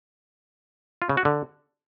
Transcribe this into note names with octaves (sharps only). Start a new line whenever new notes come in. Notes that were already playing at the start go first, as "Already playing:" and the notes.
F4
C#3
F#4
D3